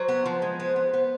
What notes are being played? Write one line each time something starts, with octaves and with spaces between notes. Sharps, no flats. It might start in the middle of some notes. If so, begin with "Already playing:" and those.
Already playing: F#3 C5
B3
F3
G#3
B3
B3
B3